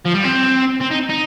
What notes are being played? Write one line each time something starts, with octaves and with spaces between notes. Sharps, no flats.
F3
G3
C4
C4
D#4
D#4